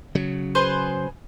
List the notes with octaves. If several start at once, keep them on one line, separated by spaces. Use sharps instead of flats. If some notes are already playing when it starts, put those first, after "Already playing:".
C#3 F#3
G#4 B4 C5